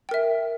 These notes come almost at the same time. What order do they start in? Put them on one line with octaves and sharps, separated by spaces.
G5 A#4 E5